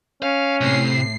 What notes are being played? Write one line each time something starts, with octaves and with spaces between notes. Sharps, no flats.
C#4 F5
A2 C3 C7